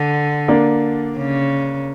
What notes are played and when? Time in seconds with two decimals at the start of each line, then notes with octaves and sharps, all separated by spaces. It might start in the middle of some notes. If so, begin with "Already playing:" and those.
Already playing: D3
0.48 A#3 D4
1.17 C#3